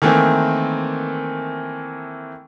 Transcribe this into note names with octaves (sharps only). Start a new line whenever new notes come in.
D#3 E3 A3 A#3 C4